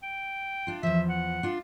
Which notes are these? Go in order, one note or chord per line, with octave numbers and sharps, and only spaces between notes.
G5
D4 F4
E2 F3 E5
F#5
D4 F4